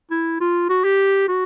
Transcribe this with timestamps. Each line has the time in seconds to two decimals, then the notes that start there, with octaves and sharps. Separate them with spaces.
0.11 E4
0.41 F4
0.69 F#4
0.84 G4
1.28 F#4